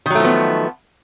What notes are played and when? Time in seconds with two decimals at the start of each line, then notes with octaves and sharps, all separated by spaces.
0.06 D#3
0.10 F#3
0.15 A3
0.20 F3
0.25 B3